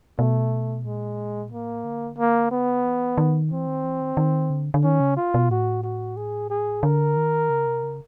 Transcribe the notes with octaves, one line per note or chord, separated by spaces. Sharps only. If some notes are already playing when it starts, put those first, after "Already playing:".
B2 A3
A#2 G#3
A2 A#3
D3
A#3
B3
E3
D#3
E3 C4
D#3
E3
D#3
D#3
D3
D3
D#3 C#4
C#3
F4
B2
A2 F#4
F#4
G#4
G#4
D3 A#4
D#3
C#3
C3
C#3